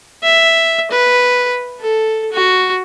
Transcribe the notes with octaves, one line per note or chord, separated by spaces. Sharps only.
E5
B4
A4
F#4